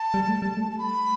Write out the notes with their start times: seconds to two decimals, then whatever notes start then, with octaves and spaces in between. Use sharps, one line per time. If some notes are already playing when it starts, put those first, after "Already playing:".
Already playing: A5
0.14 G3
0.28 A3
0.42 G3
0.57 A3
0.71 A5
0.78 B5